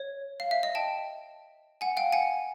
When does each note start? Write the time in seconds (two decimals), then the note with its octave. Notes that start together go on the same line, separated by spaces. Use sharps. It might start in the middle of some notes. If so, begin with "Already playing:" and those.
Already playing: C#5
0.40 F5
0.51 E5
0.63 D#5
0.75 G5 A5
1.81 F#5 G#5
1.97 F5 G5
2.13 F#5 G#5